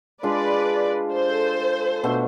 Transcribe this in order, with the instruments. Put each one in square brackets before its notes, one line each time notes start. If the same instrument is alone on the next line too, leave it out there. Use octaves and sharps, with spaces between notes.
[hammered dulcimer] G#3 D4 F4 [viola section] B4 D5
[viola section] A4 C5
[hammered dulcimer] B2 A3 D4